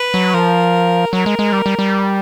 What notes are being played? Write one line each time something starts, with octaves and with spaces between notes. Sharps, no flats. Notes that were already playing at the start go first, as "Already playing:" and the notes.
Already playing: B4
F#3
F3 A#4
F#3 A#4
G#3
G#3
G3
G3
G3